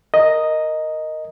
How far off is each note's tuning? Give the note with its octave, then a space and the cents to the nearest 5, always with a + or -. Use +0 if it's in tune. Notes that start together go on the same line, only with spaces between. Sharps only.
A#4 -5 D#5 +0